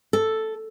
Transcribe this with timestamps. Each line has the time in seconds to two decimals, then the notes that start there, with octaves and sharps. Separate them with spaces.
0.13 A4